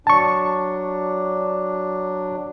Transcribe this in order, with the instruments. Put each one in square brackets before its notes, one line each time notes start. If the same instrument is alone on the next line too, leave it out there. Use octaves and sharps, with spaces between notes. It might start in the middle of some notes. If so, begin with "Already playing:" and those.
[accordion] F#3 D4 [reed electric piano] A5 C#6